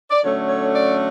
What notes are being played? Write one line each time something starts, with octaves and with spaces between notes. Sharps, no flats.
D5
D3 F#3 A3 C#4 C#5
C#5
D5